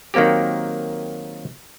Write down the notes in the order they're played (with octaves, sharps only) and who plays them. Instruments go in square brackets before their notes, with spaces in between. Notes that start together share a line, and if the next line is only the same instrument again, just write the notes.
[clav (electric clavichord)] D#3 F#3 A#3 C4 G4